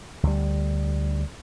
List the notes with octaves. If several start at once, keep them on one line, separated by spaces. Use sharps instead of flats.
D2 G3